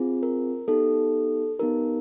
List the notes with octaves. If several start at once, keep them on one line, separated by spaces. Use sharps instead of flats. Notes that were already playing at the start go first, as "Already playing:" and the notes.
Already playing: C4 F4 G#4
A#4
B3 D#4 G4 A4
B3 D#4 G4 A#4